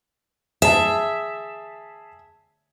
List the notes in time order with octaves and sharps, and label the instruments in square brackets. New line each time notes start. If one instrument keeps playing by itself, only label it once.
[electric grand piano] G#4 A5 [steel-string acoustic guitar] E5